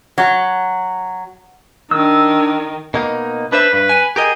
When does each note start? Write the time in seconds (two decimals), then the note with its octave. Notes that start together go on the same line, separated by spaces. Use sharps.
0.18 F#3
1.91 D#3 D4 E6
2.94 B2 A#3 D#4
3.52 D4 B4 C5 E5
3.73 G2 B4
3.89 G#5
4.16 G4 G#4 A#4 D#5